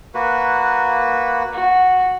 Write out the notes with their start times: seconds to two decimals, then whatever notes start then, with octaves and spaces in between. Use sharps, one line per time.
0.14 A#3 F#4 B4
1.53 F#4